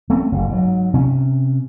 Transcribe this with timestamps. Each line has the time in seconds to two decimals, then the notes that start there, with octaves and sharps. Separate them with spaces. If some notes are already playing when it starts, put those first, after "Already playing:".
0.10 A3 C4 C#4
0.32 F#1
0.48 G#2 F#3
0.94 C3 C#4